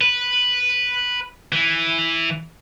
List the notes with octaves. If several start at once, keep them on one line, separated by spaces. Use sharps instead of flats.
B4
E3